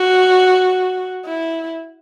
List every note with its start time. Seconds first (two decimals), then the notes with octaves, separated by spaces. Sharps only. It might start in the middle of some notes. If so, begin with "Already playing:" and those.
Already playing: F#4
1.25 E4